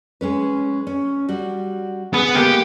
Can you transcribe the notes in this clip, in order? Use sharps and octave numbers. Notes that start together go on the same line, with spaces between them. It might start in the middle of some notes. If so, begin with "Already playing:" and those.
G#3 C#4 B4
C#4
G3 F#4
B3 G#4
G#3 A#3 G4